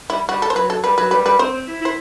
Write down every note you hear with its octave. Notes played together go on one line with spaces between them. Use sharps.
G3 E4
G3 F#4
A4
C5
F#3 B4
A4
G3 B4
F#3 B4
G3 B4
G3 B4
C4 C5
C4
E4
E4 C5